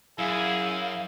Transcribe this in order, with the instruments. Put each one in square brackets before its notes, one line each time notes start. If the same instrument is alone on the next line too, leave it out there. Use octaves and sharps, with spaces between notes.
[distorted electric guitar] F#2 [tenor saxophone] E4 [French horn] G#4 [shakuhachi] F5